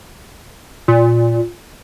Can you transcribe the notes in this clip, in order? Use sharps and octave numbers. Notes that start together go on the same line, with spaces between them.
A#2